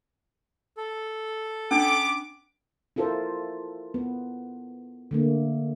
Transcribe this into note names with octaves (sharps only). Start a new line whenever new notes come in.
A4
B3 C#4 D4 D6
E4 F4 A4 A#4 C5
B3
D3 A3 A#3